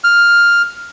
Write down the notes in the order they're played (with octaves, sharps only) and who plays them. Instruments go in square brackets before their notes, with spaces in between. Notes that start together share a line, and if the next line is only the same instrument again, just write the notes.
[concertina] F6